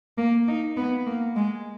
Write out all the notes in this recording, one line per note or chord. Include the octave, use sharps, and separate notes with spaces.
A#3
D#4
B3
A#3
G#3